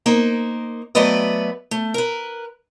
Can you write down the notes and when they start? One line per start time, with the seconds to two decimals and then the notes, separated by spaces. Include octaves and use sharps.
0.06 A#3 D#4 C5
0.95 F#3 A3 B3 B4 D5 D#5
1.71 A3
1.94 A#4 B4